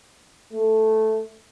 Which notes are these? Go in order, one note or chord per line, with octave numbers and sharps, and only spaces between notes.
A3